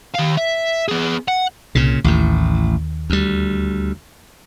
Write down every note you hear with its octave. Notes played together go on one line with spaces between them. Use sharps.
D#3 F5
E5
B3 G#4
F#5
C2 A#2 C#3
A1 D#2 A2
D2 G3